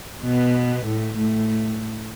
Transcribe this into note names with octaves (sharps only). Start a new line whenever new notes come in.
B2 B3
A2 A3
A2 A3